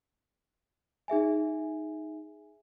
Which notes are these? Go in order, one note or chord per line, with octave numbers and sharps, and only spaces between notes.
D#4 G#4 E5 G#5